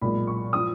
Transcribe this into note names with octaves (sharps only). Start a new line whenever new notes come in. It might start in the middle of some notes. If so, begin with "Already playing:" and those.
B1 A#2 G#3 B5
C#6
F3 D#6